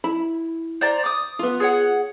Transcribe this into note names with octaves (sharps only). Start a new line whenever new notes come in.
E4 B5
C5 D5 A#5
D6 D#6
B3 F4
G#4 C#5 F#5